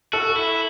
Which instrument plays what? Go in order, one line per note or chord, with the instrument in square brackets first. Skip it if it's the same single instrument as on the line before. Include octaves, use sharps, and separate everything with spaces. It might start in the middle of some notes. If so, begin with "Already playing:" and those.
[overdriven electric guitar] F#4 [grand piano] A4
[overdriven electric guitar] E4